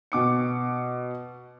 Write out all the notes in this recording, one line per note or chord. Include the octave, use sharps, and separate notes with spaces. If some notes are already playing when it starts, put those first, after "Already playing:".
B2 D6 C#7